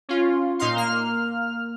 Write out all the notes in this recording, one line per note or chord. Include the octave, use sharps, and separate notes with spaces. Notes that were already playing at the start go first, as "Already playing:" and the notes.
C#4 F4
A#2 D#4 F5 C6
A#3 F6